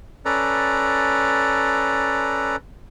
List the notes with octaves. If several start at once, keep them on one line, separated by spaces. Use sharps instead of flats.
C#4 A4 B4 D5 A#5